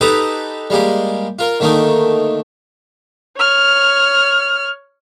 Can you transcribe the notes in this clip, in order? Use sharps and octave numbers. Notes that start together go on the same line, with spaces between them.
D#4 G4 A4 B4 A#5 D#6
G3 G#3 A#3 G4
F4 A#4
D3 D#3 A3 A#3 D#4
C#5 F6